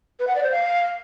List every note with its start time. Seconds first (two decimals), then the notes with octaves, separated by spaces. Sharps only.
0.20 B4
0.27 F#5
0.35 D5
0.43 C5
0.51 F5